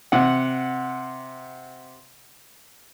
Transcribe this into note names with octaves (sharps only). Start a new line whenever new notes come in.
C3 F#5